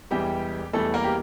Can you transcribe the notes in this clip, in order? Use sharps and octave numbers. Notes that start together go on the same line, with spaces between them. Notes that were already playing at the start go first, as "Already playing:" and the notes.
E1 E2 E3 G3 G4 G5
E1 E2 E3 G3 A3 A4
A#3 A#4
G4